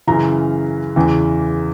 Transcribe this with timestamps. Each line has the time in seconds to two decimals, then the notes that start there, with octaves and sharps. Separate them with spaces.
0.07 F#2 C#3 E3 A#5
0.96 E2 C#3 E3